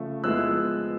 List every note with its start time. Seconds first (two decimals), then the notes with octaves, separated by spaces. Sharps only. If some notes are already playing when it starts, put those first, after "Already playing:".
Already playing: C#3 F3 A3
0.24 F3 G#3 B3 E4 E6 F#6